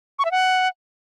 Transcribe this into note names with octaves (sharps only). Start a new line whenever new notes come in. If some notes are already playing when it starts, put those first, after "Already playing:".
C#6
E5
F#5